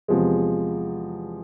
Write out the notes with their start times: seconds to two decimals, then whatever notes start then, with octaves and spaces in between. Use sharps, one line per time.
0.08 E2 C3 F3 G#3